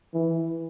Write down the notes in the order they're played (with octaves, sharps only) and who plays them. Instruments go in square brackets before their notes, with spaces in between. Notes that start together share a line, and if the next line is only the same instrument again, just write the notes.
[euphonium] E3